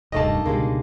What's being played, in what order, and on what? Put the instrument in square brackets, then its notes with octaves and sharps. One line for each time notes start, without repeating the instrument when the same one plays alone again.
[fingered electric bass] D#1 C2 G2 [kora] D#3 A3 A#3 [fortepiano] D#5 A5
[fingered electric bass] C#2 B2 D3 [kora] G3 G#3 A#3